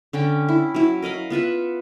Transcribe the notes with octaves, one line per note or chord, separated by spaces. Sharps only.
D3 C#4 G5
E4
F#3 E4
A#4 D#5 F5 B5
B3 F4 E5 F#5